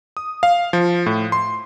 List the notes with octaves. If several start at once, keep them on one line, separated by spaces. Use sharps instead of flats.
D#6
F5
F3
A2
C6